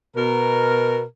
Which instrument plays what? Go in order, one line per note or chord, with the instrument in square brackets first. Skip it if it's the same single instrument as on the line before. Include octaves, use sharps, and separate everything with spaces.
[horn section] B2 A#4